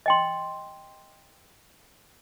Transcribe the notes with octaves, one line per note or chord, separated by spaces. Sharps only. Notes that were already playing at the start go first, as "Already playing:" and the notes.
D#5 G5 C6